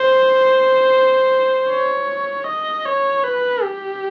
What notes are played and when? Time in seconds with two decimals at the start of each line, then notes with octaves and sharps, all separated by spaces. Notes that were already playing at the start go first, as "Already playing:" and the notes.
Already playing: C5
1.69 C#5
2.47 D#5
2.85 C#5
3.24 B4
3.63 G4